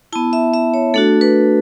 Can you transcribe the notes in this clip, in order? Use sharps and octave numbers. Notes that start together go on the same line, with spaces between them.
B3 E4 A5
E5
E5
C#5
A3 D4 F#4 A4
B4